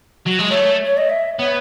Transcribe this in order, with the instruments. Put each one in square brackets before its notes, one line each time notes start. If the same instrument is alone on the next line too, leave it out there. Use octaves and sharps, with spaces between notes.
[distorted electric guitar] F#3
G#3
[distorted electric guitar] A3 [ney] C#5
[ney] C#5
D#5
E5
[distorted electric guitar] B3 [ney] C#5